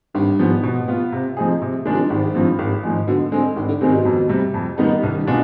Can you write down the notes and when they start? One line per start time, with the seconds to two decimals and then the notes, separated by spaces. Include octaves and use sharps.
0.14 G#1 G2
0.39 G#2 F3 B3
0.63 B2
0.88 B3 F4
1.12 C3
1.37 F3 C4 D#4 G#4
1.62 C3
1.85 D#3 G#3 D4
1.94 F2
2.02 G2
2.10 G#1 G#2
2.35 G2 F3 C4 F4
2.59 G#1
2.83 G#2 F3 G#3
3.07 B2 D3
3.32 D3 G#3 C4
3.56 G#1 D#3
3.68 D3
3.81 G#2 C3 D#3 G#3 C4
3.92 B2
4.05 F2
4.29 C3 G3
4.54 F2
4.78 D#3 G3 B3 D#4
5.02 C2 G2
5.19 G2
5.27 B2 G#3 D4 F4